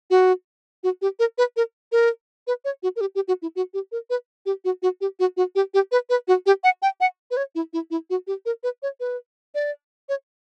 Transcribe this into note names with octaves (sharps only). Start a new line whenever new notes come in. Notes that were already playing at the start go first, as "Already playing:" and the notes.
F#4
F#4
G4
A#4
B4
A#4
A#4
B4
C#5
F#4
A#4
G4
G4
F#4
E4
F#4
G4
A#4
B4
G4
F#4
F#4
G4
F#4
F#4
G4
G4
B4
B4
F#4
G4
F#5
G5
F#5
B4
C#5
E4
E4
E4
F#4
G4
A#4
B4
C#5
B4
D5
C#5